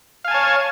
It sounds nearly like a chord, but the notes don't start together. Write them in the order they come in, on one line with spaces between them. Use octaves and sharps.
F5 G#5 A5 C#5